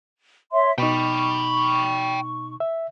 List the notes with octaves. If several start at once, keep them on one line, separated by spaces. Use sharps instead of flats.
C#5 E5 C6
B2 D#4 G5 B5 C#6
E5